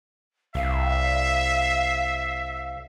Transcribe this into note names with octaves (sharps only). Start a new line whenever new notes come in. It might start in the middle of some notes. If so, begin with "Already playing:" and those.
C2 E5 F5